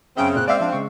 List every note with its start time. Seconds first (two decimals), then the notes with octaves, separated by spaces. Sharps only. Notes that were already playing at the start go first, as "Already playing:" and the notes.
0.17 F#2 C#3 C4 C#4 E5 G5
0.36 A#2 F#6
0.48 G#3 C4 D5 E5 F5
0.60 F3 D4 F5
0.73 C#3 G#3 C#6